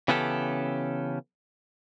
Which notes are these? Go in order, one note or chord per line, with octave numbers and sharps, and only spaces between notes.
C#3 E3 B3 C#4 G4 A4